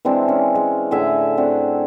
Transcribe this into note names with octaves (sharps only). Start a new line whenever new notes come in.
E3 G#3 C4 D4
C#4
G#3
A2 D3 G#4 E5
C4 D4 F#4